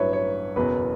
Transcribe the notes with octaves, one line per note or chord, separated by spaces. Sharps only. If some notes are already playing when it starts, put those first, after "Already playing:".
Already playing: A1 G2 F#3 B4 C#5 E5
C#5
F#1 E2 B2 F#3 B4